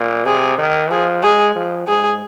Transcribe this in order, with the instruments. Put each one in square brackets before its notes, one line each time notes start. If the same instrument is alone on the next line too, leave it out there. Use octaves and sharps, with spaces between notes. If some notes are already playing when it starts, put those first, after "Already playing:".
Already playing: [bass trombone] A#2
[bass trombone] C3 [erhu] G#4
[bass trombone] D#3
[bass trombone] F3 [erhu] G#4
[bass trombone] G#3 [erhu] G#4
[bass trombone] F3
[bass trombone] G#2 [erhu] G#4